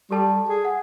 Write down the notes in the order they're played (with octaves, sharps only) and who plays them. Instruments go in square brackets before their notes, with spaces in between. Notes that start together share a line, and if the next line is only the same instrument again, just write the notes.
[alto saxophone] G3 [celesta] G4 A4 A5
[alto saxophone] G#4
[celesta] F#5